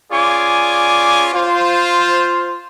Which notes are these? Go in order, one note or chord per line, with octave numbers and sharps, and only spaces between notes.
C#4 F4 G#4 D5 G#5 D6
F4 C5